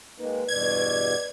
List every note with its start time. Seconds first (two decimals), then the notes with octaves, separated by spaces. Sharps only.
0.19 D#3 G#3 A#3 B4
0.48 E2 G2 B2 D5 G#6